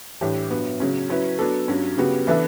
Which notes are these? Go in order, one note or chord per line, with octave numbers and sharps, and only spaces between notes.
A2 E3 G3 D4 G4
G2 F#3 B3
C#3 F#3 C#4
F#3 C#4 E4 B4
F#3 B3 D4 A4
G2 F#3 C#4
C#3 G3 B3 F#4
E3 B3 D4 A4 E5